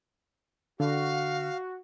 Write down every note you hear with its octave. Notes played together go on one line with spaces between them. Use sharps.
D3 F#4 F5